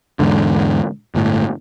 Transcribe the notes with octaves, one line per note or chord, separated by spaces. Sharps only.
E2 G#2 D3
G1 A2